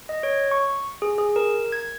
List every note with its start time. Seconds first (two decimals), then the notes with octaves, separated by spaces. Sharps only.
0.09 D#5
0.23 C#5
0.51 C#6
1.02 G#4
1.18 G#4
1.36 A#4
1.72 G#6